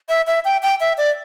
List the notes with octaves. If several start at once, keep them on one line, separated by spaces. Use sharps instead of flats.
E5
E5
G5
G5
E5
D5